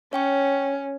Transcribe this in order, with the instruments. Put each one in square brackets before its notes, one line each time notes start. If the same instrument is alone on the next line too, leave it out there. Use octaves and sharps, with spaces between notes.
[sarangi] C#4 [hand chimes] C#5 G5 C#6